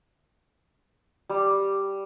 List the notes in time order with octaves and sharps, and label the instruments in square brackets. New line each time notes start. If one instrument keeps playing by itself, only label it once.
[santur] G3